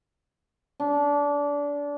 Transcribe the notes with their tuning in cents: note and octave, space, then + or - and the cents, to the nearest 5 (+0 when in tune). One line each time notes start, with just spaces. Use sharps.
D4 -25